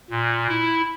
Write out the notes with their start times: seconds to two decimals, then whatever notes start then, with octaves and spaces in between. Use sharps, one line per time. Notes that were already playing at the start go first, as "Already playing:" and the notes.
0.10 A#2
0.49 E4